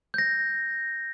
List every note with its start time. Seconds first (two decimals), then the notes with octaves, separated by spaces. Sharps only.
0.14 G6 A#6